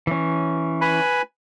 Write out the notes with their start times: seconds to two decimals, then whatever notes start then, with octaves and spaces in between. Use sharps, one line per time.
0.07 E3 C#4
0.81 B4 G#5 B5